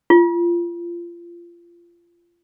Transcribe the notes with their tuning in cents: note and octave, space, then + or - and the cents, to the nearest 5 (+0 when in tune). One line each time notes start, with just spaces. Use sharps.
F4 -25